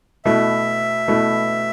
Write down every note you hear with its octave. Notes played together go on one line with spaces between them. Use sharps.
B2 A3 E4 E5
B2 A3 E4